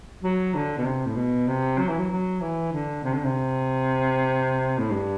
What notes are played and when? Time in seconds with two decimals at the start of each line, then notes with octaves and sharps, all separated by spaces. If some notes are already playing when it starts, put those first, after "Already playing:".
0.23 F#3
0.54 D3
0.78 B2
0.85 C3
1.06 A2
1.16 B2
1.48 C3
1.78 F#3
1.88 E3
1.99 F#3
2.10 F#3
2.41 E3
2.73 D3
3.04 C3
3.14 D3
3.25 C3
4.78 A2
4.91 G2